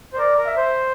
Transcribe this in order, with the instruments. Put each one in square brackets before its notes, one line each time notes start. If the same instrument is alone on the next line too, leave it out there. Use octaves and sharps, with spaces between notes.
[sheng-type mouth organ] C5
[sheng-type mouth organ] A#4 [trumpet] D5
[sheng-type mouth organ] A#4
[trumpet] E5
[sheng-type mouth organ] C5